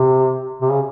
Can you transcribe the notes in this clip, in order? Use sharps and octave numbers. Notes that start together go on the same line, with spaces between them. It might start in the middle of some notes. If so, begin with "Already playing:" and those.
Already playing: C3
C3
C#3